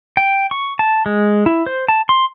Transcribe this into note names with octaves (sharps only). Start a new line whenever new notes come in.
G5
C#6
A5
G#3
E4
C5
A5
C6